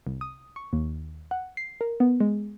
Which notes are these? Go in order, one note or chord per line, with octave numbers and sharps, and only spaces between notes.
C2
D#6
C#6
D#2
F#5
C7
A#4
B3
G#3